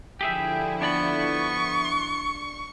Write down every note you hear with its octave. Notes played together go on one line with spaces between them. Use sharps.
D3 F3 E4 G4 G#4 E5 G5
B3 D4 D5 B5 C#6